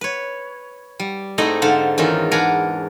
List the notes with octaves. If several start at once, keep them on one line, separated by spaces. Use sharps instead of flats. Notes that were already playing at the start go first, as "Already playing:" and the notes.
B4 C#5
G3
G#2 A3 C4 D#4 E4 D#5
G#2 D3 C5 F5 F#5
E2 D#3 C#4 D#4 F4 E5
D4 A#4 F#5 G#5 A#5 B5